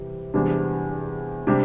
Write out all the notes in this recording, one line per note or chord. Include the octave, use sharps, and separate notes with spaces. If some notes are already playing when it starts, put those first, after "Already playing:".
Already playing: C3 E3 G3
E2 C3 E3 G3 D4
C3 G3 D4 G4